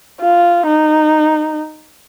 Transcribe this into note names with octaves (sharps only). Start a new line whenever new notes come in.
F4
D#4